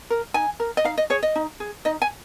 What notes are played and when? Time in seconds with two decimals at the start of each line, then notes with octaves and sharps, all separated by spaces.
0.10 A#4
0.34 D#4 G#5
0.60 A#4
0.77 D#5
0.84 D#4 F5
0.98 D#5
1.10 G#4 C#5
1.23 D#5
1.36 D#4
1.60 G#4
1.85 D#4 D#5
2.02 G#5